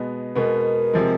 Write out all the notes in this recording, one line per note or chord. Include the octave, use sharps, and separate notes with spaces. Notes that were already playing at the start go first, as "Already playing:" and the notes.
Already playing: B2 G#3 B3
B2 G#3 B3 A#4
C3 F3 G#3